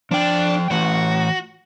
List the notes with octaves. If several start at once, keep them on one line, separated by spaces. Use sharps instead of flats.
F3 D4 G5
E3 A3 F#4